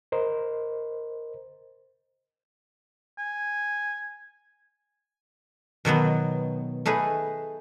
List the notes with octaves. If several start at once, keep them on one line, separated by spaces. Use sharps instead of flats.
A#4 C5 D#5
G#5
B2 D#3 F#3 B3
A3 D#4 G#4 B4